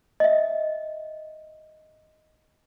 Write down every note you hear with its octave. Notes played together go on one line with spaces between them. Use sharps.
D#5 E5